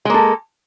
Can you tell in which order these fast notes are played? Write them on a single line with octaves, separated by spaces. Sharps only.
G#3 A#3 A4